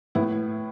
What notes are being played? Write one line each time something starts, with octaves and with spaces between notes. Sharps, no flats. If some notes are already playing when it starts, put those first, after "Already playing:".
A2 B3 E4